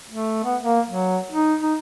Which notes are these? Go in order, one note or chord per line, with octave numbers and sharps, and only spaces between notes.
A3
B3
A#3
F#3
D#4
D#4